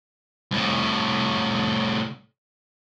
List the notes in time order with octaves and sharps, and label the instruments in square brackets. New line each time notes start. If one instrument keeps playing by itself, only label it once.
[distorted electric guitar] C2 A2